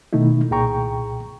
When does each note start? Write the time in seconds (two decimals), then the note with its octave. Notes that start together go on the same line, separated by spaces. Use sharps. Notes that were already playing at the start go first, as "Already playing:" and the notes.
0.13 B2 D#3 A3 D#4 E4
0.51 C2 A#2 G#4 G5 A#5 C#6